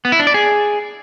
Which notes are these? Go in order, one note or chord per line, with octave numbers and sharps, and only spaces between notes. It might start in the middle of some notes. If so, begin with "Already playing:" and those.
B3
E4
D4
D5
G#4